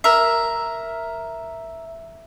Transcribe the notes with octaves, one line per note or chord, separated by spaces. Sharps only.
A#4 E5